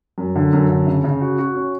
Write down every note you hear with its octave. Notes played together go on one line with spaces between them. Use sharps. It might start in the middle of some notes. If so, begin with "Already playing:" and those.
F#2
D3
F#2
D3
C#3
C#3
F#4
F#4
C#4